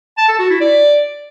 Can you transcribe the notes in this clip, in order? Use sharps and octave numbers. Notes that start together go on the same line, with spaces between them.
A5
A4
F#4
E4
D5